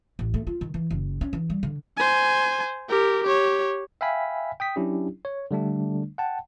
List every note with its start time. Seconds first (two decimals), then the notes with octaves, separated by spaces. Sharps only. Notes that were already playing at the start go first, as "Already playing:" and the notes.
0.19 A1
0.34 A3
0.47 F4
0.61 D#3
0.74 E3
0.91 F#1
1.21 C#4
1.33 E3
1.50 G3
1.63 D3
1.97 C5 G#5
2.89 G4 A#4
3.23 G4 C#5
4.01 E5 F5 G5 G#5 B5 B6
4.60 G5 D#6 B6
4.76 F#3 C#4 D4 E4 G4
5.25 C#5
5.51 D3 G3 A3 D4
6.18 F#5 G5 A5